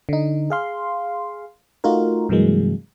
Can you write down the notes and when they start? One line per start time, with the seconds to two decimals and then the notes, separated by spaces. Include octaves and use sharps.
0.09 D3 D#4
0.50 G#4 F5 C6
1.84 A3 D#4 F4 F#4 A#4
2.29 G2 C3 E3 F#3 G#3 A#3